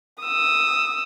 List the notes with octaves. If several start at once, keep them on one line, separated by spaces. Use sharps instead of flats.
D#6 E6